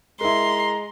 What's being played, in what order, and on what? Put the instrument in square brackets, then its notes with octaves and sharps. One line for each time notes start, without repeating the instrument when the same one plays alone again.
[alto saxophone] G#3 [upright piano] E4 A#4 [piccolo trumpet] A#5 [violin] C6